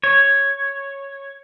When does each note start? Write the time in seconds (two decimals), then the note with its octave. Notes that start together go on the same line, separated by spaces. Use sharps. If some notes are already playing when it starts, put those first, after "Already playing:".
0.04 C#5